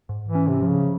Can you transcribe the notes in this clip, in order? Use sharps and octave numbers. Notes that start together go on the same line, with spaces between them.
G#2
E3
C#4
C3
F3
C#3